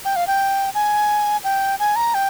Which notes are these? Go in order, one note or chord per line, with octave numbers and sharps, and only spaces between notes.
G5
F5
G5
G#5
G5
G#5
A#5
G5